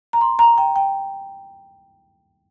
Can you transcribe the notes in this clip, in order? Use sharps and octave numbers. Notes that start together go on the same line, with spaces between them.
A#5
C6
A#5
G5
G5